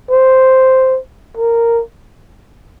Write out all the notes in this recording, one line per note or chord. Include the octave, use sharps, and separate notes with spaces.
C5
A#4